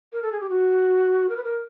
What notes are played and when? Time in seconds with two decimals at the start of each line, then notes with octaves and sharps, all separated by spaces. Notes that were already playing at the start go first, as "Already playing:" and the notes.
0.13 A#4
0.23 A4
0.32 G#4
0.41 G4
0.50 F#4
1.29 A#4
1.37 B4
1.44 A#4